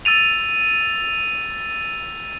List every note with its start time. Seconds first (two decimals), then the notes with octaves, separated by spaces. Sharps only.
0.05 E6 A6 D#7 F7